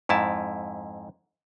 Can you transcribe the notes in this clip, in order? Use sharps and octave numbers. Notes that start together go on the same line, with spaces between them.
F2 G#2 E4 A5